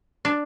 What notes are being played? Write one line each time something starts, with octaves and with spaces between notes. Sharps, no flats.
D4